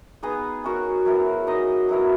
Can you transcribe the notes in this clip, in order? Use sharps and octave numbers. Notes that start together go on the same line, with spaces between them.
B3 D#4 G#4 D#5
C#4 F#4 A#4
F#3 B3 E4 A#4
D#4 A#4 D#5
F#3 B3 E4 A#4